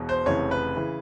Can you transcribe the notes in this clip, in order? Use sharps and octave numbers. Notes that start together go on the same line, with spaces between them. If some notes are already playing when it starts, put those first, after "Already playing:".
Already playing: E1 E2 B2
C5
F1 F2 C#3 E3 C#5
B4
C#3 E3